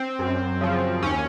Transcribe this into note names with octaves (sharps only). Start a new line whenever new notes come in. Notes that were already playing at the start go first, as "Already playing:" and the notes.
Already playing: C4
F#2
C#3 F3
D#2 C#4